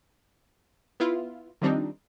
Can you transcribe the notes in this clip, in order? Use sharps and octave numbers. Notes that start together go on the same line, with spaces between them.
B3 E4 F4
D#3 F3 G3 C4 D4 D#4